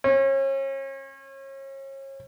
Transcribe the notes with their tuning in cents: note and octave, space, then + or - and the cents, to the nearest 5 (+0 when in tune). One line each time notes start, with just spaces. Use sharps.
C#4 -35